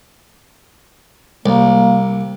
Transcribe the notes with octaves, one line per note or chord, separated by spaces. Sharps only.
C2 A#3